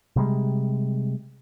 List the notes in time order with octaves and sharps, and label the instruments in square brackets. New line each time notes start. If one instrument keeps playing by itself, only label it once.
[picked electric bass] C3 G3 G#3